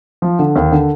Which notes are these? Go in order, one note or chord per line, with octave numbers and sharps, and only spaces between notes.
F3
D3
D#2
D3